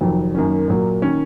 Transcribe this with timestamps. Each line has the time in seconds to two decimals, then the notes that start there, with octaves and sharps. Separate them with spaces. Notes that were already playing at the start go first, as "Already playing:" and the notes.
0.01 F1 F2 D#3 F#3
0.35 F#2 D#3 A#3 C#4
0.68 A#2 F#3 A#3
1.02 D#3 A#3 C#4